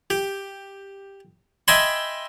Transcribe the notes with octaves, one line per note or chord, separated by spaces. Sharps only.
G4
D#5 E5 G5 G#5 B5 C6